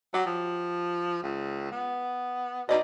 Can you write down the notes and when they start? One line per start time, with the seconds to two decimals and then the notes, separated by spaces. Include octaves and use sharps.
0.14 F#3 G4
0.26 F3
1.23 C#2
1.72 B3
2.69 B2 D#4 D5 D#5